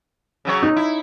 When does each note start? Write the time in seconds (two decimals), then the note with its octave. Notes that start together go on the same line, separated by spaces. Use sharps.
0.45 C#3 F#3 C#5
0.63 D#4
0.76 E4